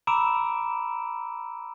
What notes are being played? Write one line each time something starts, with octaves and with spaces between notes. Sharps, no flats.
A#5 B5 D6 E6 D7 E7